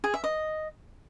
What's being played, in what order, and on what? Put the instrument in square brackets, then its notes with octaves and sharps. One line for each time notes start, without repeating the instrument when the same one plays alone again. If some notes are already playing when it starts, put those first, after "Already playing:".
[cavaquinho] G#4
E5
D#5